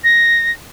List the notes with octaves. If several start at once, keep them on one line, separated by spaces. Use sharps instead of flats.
A#6